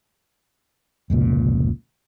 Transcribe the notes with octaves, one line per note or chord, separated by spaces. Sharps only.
F1 C#2 A#2